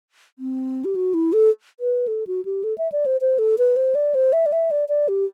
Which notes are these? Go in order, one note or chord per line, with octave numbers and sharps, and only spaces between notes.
C4
G4
F#4
E4
A4
B4
A4
F#4
G4
A4
E5
D5
C5
C5
A4
B4
C5
D5
C5
E5
D5
E5
D5
D5
G4